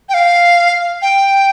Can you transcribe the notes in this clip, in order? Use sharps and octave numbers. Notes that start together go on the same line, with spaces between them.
G5
F5
G5